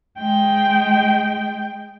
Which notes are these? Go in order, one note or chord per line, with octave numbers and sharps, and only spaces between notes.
G#3 G5